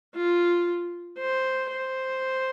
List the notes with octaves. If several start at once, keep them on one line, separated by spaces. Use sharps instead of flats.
F4
C5
C5